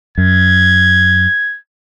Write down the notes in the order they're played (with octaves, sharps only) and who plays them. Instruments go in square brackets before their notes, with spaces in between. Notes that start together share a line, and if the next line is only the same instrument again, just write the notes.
[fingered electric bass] F#2 [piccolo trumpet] G#6